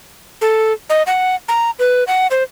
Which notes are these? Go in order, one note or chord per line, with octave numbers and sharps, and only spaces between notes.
A4
D#5
F#5
A#5
B4
F#5
C5